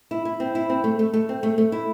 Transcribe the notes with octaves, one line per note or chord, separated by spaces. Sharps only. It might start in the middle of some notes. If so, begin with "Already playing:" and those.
E4
E4
C4
E4
C4
A3
A3
A3
C4
A3
A3
E4